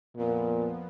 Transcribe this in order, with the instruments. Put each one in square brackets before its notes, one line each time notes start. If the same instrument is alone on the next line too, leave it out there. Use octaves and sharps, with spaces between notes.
[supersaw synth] F2 F3 B3 [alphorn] A#2